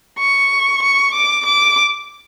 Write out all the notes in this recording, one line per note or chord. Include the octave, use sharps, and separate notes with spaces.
C#6
C#6
D6
D6